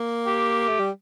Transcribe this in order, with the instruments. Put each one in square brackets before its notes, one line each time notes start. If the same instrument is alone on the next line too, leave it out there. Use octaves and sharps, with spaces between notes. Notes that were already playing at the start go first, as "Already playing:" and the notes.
Already playing: [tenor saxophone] A#3
[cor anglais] G4
[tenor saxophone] A3
G3